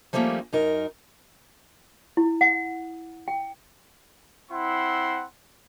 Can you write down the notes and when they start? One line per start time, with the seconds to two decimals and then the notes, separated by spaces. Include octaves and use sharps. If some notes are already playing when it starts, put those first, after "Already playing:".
0.13 F3 G3 A3 A#3 C#4
0.53 F#2 D#4 A#4
2.17 E4
2.41 F#5
3.28 G5
4.50 C4 E4 F#5 C6